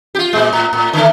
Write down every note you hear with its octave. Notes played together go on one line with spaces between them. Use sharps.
F4 G4
A#2 G#3
A2
A2
D3 A3